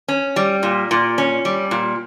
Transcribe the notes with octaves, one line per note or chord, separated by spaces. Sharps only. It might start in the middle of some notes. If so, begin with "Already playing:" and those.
C#4
G3
A#2
A#2
C#4
G3
A#2